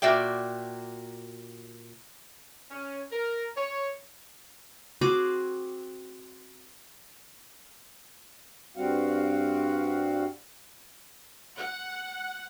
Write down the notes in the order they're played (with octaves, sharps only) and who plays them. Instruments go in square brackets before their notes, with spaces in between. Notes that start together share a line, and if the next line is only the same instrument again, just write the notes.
[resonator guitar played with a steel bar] A#2 F#4 D5 E5 G5
[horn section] C#4
A#4
C#5
[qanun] C4 F#4 G#4 D6
[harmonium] G2 G3 C4 F#4 F5 F#5
[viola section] F#5